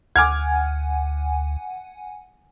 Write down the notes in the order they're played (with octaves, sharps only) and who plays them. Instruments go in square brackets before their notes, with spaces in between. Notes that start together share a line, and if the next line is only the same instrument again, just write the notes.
[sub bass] D2 [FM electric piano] F#5 G#5 [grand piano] D6 F6 G#6